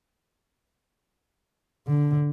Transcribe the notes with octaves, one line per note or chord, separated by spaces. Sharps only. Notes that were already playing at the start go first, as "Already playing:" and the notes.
D3